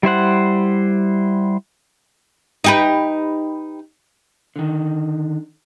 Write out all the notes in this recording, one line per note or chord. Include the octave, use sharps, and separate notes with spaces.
G3 E4 C5 F#5
D#4 G4 B4
D3 D#3